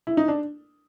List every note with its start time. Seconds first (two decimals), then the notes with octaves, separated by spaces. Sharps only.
0.07 E4
0.17 D#4
0.28 D4